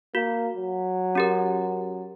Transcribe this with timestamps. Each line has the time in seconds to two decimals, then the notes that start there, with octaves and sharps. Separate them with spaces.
0.15 A#3 F#4
0.56 F#3
1.15 C#4 G4 A#4